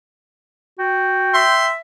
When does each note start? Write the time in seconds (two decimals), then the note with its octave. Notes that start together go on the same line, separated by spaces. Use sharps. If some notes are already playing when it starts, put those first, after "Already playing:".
0.79 F#4 G5
1.34 E5 C6